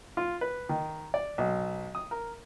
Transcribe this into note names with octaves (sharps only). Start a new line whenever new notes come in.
F4
B4
D#3
D5
B1
D#6
A#4